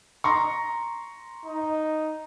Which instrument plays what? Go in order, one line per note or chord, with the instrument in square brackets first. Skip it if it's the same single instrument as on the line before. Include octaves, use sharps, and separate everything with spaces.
[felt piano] A#5 C6 C#6
[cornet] D#4